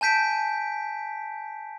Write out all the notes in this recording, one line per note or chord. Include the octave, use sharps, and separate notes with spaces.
G#5 A5 G6 B6 D7